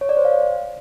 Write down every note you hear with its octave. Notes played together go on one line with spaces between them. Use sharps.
C#5
D5
C5
F5